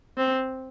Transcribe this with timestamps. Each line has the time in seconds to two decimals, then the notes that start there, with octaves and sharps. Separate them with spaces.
0.17 C4